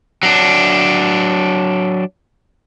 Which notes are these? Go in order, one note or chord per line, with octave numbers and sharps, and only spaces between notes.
F#3 D4